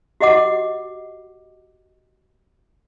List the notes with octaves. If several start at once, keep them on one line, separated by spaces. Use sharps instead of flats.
F#4 G4 D#5 F#5 D6